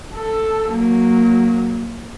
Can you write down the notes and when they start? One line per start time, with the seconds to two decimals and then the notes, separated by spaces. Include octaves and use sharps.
0.15 A4
0.70 F#3 A#3